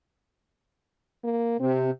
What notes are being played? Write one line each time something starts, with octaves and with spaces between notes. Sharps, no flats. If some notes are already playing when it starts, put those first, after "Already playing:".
A#3
C3 C4